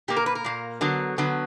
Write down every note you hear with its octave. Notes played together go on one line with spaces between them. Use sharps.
A#2 A#3 G4
A#4
B4
A#4
A#2 A#3
D3 F#3 B3
D3 F#3 B3